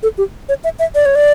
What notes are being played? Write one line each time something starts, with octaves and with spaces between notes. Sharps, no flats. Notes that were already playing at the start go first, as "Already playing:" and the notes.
A4
G4
C#5
E5
E5
D5
C#5
D5